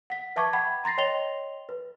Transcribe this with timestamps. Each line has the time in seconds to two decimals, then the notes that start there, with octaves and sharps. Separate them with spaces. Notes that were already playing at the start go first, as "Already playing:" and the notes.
0.10 F#5 B6
0.36 B4 E5 A5 C#6 D6 G#6
0.53 F#5 G5 B5 G#6
0.84 A#5 C6 A6 A#6 C7
0.98 C#5 D#5 G5 C6 F7 G7
1.69 B4